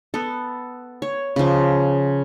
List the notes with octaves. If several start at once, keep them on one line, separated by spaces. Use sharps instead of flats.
B3 A4
C#5
C#3 F3